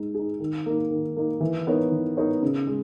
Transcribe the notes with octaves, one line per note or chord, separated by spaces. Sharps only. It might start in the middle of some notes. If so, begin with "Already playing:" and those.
Already playing: G#3 D#4
D#4 G#4
D#3
A#3 D#4
D#3
A#3 D#4
E3
B3 D#4 A#4 C#5
E3
B3 D#4 A#4 C#5
C#3
G#3